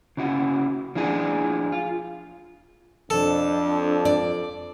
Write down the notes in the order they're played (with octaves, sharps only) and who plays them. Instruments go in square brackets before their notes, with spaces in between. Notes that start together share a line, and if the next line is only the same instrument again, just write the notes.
[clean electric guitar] C#3 E4 F#4
F3 D4 E4 G#4
F4
[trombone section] F2 [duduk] D4 [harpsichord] A4
[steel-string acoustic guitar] D5